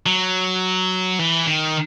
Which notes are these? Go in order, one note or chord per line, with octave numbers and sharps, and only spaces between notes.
F#3
E3
D#3